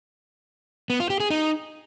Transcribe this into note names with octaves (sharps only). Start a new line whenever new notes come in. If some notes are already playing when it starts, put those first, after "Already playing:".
B3
F4
G4
G#4
D#4